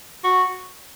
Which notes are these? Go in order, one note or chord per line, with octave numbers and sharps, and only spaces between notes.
F#4